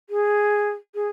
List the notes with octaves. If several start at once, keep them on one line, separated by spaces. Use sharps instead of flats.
G#4
G#4